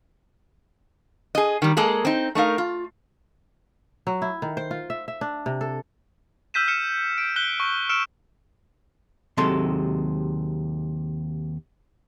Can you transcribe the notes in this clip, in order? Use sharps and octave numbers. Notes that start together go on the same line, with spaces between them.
G#4 D#5
D#3 G3
G#3 A#3 G#4 A4
C4 D#4
A3 D#4 A#4 F5
F4
F#3
E4
D#3
C5
F4
E5
E5
D4
C3
A4
E6 F6 G6 B6 D#7 E7
F6 C#7 E7
D7
F#6 B6 G7
C#6
E6 F6 C#7 D7 E7
D#2 C3 F#3 G#3 A4 C6